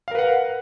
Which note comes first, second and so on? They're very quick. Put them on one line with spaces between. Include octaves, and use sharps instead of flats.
F5 A#4 B4 F#5